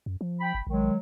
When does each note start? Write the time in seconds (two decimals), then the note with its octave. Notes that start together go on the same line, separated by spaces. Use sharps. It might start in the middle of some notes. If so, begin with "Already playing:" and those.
0.06 F#2
0.21 F3
0.41 G5 B5
0.55 G1
0.67 A#1 D#3 F#3 G#3